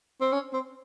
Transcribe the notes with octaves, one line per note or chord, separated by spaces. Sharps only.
C4
C#4
C4